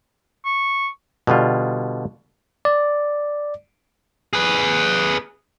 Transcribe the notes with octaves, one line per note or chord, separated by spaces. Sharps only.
C#6
B2 D3 G3 F4
D5
G#4 B4